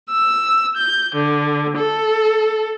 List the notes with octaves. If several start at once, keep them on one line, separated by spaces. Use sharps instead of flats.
E6
G6
D3
A4